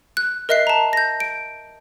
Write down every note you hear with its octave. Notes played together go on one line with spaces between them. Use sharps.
F#6
A#4 D#5 E5 F#6 C7
A5 A#5
G6 A#6
D7